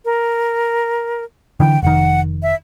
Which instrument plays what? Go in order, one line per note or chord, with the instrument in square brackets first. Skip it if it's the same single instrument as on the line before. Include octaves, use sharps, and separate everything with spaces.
[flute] A#4
[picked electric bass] D3 E3 [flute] G5
[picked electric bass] F1 D#3 [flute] F#5
[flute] E5